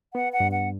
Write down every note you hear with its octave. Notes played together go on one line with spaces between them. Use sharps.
B3 F#5
F#5
G2
F#5